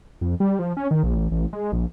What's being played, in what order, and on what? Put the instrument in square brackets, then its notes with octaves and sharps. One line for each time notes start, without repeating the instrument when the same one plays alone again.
[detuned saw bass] F2
G3
F3
C#4
D#3
A#1
A1
A1
G#3
A#1